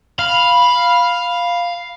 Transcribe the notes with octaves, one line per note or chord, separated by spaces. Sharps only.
F5 B5